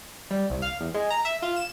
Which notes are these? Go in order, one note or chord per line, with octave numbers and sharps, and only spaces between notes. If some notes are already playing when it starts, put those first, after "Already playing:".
G3
C2
F5
E2
G#3
A#5
E5
F4
E7